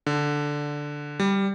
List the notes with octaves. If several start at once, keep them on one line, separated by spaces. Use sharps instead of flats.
D3
G3